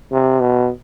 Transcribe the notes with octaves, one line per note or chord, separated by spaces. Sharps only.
C3
B2